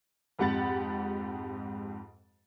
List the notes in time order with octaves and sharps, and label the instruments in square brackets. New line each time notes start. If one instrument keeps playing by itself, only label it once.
[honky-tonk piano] F2 G#2 G4 F#5 B5 A6